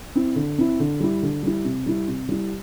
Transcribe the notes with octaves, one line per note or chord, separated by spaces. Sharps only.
C4 E4
D3
C4 E4
D3
G3 E4
D3
G3 E4
C3
G3 E4
C3
G3 E4